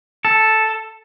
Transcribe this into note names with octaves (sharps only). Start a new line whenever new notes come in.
A4